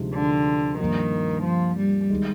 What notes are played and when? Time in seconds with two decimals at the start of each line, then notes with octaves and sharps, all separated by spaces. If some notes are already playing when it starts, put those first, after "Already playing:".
Already playing: D2 C3 F3 G#3 D#4
0.15 D3
0.80 G2 D#3 F3 A#3
1.45 F3
1.78 G3
2.10 D#3 G#3